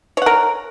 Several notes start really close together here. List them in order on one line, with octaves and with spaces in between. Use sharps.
C#5 F#5 A#4